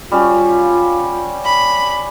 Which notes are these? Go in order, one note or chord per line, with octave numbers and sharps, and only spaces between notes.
G3 C#4 F4 F#4
B5